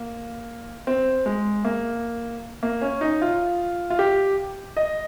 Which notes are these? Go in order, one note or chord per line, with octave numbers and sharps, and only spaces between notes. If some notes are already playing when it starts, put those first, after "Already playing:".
Already playing: A#3
C4
G#3
A#3
A#3
C#4
D#4
F4
F4
G4
D#5